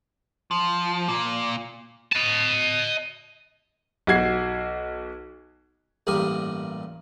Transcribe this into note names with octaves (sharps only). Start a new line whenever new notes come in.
F3
A#2
D#5 A5
B1 F#4 G#6 C7
A1 G2 A#2 G4 A#4 D#6